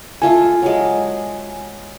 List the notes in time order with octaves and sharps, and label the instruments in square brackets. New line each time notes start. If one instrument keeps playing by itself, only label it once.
[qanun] A3 F4 A4 [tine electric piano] G#5
[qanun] F#3 G#3